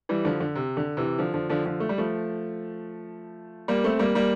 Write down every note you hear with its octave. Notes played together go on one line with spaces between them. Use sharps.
E3 G3
D3 F3
D3
C3
D3
C3 E3
D3 F3
D3 F3
D3 F3
D3 F3
A3
G3
F3 A3
G3 A#3
A3 C4
G3 A#3
G3 A#3